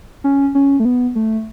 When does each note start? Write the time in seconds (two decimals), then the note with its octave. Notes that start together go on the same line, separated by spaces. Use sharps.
0.24 C#4
0.55 C#4
0.80 A3
0.85 B3
1.15 A3